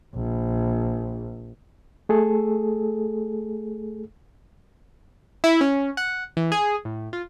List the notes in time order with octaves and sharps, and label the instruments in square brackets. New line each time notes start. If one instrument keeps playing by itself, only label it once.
[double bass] A#1
[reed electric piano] A3 G#4 A4
[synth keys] E4
C#4
F#5
E3
G#4
A2
F4